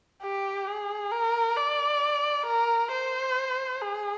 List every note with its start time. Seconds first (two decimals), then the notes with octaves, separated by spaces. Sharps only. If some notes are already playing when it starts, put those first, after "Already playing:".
0.23 G4
0.67 G#4
1.12 A#4
1.57 D5
2.46 A#4
2.91 C5
3.81 G#4